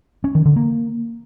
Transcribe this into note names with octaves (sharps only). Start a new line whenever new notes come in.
C#4
D#3
D3
A#3